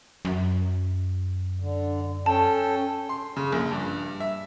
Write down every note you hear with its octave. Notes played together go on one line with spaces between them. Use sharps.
F#2
D3
C#4 A4 G5 A5
C6
C#3
A#1
G2
E5